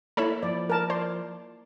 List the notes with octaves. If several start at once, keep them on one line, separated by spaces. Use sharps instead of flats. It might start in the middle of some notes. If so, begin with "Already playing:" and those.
A#3 E4 A4 C#5 E5 B5
F3 D5
A#4 A5
C5 D5